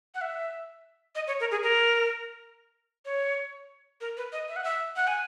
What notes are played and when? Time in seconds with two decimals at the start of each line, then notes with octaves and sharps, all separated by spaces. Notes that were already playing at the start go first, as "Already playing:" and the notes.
0.15 F#5
0.21 E5
1.15 D#5
1.27 C#5
1.40 A#4
1.51 G#4
1.63 A#4
3.05 C#5
4.01 A#4
4.17 B4
4.32 D#5
4.48 E5
4.56 F#5
4.64 E5
4.96 F#5
5.07 G#5